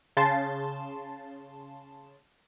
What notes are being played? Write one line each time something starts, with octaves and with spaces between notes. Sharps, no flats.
C#3 A5 C6